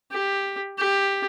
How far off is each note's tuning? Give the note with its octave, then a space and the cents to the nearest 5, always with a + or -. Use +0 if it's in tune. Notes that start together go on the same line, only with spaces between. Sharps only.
G4 +10
G4 +10